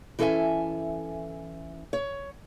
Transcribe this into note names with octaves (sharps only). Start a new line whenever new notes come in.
E3 C#4 A4 C#5 E5 G#5
C#5